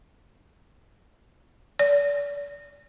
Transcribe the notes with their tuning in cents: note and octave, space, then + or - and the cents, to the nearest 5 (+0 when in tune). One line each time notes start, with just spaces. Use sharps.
D5 -40